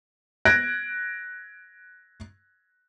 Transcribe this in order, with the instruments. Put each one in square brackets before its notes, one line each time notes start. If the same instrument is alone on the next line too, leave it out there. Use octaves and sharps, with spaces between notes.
[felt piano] F#6 G#6 A#6 D7